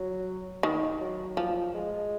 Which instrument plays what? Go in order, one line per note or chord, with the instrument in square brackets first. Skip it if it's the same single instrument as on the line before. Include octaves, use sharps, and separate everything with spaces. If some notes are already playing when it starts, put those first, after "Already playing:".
Already playing: [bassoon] F#3
[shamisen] D#3
[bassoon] F#3
[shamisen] F3
[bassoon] G#3